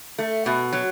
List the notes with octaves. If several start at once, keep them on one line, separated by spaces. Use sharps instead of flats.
A3
B2
F#3